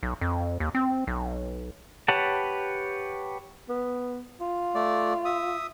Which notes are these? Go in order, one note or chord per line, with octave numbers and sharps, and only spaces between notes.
B1
F2
D#2
C4
B1
G4 B4 C#5 F#5 A5
B3
F4
A3 D5
E5 D#6